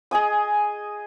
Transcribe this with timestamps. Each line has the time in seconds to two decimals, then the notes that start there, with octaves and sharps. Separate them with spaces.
0.11 G#4 D#5 G#5 D#6